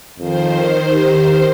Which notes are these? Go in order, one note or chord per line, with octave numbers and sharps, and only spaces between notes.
F2 D#3 C5
G4